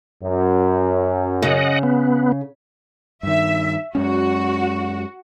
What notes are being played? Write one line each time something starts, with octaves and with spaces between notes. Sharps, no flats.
F#2
C#3 D#5 F#5
B3
G2 D#3 E5
F#2 G#3 C#4 F#4